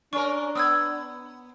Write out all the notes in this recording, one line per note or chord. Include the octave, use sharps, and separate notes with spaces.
C#4 D4 A#4 C#6
B3 D#6 E6 G#6